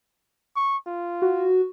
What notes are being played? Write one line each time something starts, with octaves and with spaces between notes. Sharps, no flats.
C#6
F4
F#4